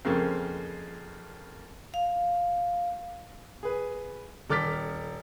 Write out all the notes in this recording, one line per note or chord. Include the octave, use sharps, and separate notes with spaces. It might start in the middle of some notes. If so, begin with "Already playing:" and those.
F2 C#3 A#3 C4
F5
G#4 B4
D#1 A4 D6 F6 A6 B6